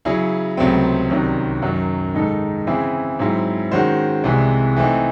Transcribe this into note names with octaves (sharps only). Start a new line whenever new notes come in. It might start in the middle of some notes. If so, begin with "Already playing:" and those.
C#3 F#3 C#4 E4 G#4
C#2 C3 F#3 A3 C4
C2 C3 D#3 F#3 C#4
F#2 D#3 F#3
G#2 D#3 G#3 D#4 A4
C#3 E3 C4 E4 G#4
G#2 F#3 C4 E4
D#3 G#3 C#4 F#4 C5
C2 C3 E3 G#3
E3 A3 C4 D#4